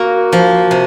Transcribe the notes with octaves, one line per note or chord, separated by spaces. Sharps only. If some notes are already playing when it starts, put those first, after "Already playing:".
Already playing: A#3 F#4
F3
C3